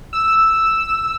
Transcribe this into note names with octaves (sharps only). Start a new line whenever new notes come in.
E6